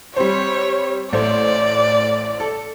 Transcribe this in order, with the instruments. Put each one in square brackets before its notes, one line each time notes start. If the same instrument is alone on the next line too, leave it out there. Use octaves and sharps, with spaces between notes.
[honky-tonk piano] G3 C4 C5 [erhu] C#5
[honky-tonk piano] A1 A3 C5 [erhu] D5
[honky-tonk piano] A4